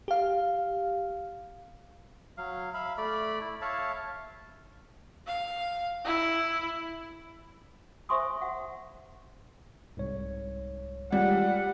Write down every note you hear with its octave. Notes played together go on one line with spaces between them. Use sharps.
G4 F5
F#3 F5
E5 F5 B5
A3 D5 B5
E4
C#5 E5 F5 A5
F5
E4
C5 E5 G#5 C6 C#6 D#6
F#5
C2 G#2 C#5
G3 G#3 F4 G4 F#5